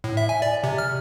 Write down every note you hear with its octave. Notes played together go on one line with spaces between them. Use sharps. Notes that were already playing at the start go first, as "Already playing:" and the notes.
A2
E5
G#5
D5
C3
F6